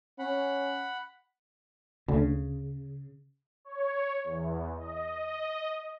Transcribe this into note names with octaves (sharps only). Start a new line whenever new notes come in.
C#4 F#5 B5
D2 C#3
C#5
E2
D#5
D#5